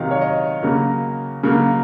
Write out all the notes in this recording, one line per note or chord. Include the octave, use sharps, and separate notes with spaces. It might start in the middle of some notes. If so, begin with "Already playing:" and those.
Already playing: C3 D#3 F#3 D#5 F5
C#5
D#5
C#3 F#3 A#3
C#3 F#3 A#3